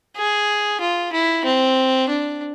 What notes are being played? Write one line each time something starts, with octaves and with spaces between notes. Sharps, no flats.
G#4
F4
E4
C4
D4